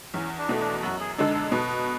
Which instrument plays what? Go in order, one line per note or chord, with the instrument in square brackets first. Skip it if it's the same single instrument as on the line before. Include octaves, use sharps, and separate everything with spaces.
[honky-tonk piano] E2 [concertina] C#4
[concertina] D4
[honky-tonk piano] B2 A3
[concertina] D4
[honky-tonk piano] F#2 [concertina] F#4
[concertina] G#4
[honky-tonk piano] D3 G#3 D4 [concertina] A4
[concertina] A4
[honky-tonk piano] B2 [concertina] B4